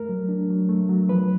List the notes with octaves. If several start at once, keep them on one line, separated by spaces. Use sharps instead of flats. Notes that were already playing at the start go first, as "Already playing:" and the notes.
Already playing: A3 A#4
F#3
D4
F#3
A3
F#3
F3 B4